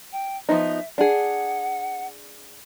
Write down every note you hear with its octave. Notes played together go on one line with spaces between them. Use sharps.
G5
F3 B3 D#4 E5
D4 G#4 F#5